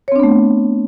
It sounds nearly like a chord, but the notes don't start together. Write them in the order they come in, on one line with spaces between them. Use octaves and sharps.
C#5 C4 D4 B3 A3